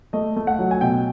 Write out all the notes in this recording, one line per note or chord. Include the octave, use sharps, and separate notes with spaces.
A3 D#5
A3
F#5
F#3
G#5
B2 G5